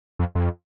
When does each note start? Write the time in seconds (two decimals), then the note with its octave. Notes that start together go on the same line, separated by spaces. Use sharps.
0.19 F2
0.35 F2